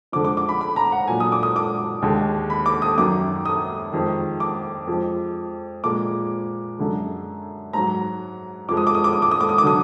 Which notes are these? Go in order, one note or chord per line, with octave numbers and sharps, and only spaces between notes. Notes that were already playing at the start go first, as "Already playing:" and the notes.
F2 D3 G#3 D6
D6
D6
B5
B5
A#5
F#5
A#2 F#3 G#5
D#6
D6
D#6
D6
D#2 D3 G#3
B5
D6
D#6
F#2 D#3 F#3 D6
D#6
F2 D#3 G#3
D6
F2 F3 G#3
A#2 F3 G#3 D6
F#2 D3 G#3
G#2 F#3 A#5
F2 F3 G#3 D6
D#6
D6
D#6
D6
D#6
D6
D#6
D6
D#6
D6
D3 F#3 D#6